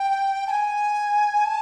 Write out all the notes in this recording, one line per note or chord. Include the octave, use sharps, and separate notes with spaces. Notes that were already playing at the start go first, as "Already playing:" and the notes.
Already playing: G5
A5
G#5
A5